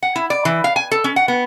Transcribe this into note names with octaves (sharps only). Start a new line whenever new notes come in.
F#5
E4
D5
E3
F5
G#5
A4
C#4
F#5
B3